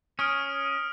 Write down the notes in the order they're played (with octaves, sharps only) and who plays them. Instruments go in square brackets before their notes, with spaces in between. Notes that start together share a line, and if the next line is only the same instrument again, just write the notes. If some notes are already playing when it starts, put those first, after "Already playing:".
[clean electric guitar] C#4 [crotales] D#6 F6 D7